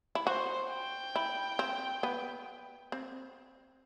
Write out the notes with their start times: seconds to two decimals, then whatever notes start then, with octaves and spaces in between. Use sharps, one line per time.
0.15 E4
0.26 F#4 C5
0.70 G5
1.16 E4
1.59 C4
2.03 B3
2.92 C4